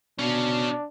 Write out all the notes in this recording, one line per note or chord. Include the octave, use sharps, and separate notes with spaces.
B2 C#4 D4 F5